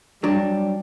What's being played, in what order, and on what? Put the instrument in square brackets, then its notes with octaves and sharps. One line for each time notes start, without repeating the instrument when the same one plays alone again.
[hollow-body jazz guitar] F#3 D4 [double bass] G3